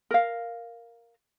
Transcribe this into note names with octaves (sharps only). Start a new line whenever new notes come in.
A#4 F5